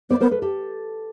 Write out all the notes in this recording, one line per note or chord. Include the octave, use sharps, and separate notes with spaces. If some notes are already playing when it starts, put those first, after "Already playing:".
B3 C5 D5
B3 A#4 C5
A4 B4
G4 A4